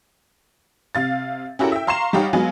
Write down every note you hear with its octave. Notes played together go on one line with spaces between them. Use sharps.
C3 F5 A6
C#4 E4 F#4 G4 A4 A#4
E5 G5
F5 A#5 C6 C#6 C7 E7
G3 D#4 G4 C#5 F5 F#5
F#3 G#3 B3 F4 F#4 G#4